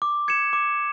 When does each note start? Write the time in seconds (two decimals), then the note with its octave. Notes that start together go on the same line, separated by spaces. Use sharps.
0.02 D6
0.28 G#6 C#7 E7
0.53 D6